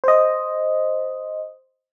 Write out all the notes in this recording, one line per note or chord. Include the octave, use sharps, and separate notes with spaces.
C5 D#5